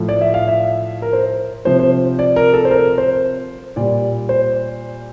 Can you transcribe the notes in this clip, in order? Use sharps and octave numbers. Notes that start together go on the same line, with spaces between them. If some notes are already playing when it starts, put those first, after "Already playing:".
Already playing: A2 F3
D5
E5
F5
E5
A#4
C5
C3 F3 C5
C5
D5
A#4
A4
C5
A#4
C5
A#2 G3 D5
C5